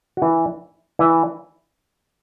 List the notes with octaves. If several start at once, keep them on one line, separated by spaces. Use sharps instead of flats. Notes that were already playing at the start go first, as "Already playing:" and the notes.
F#4
E3 E4
E3 E4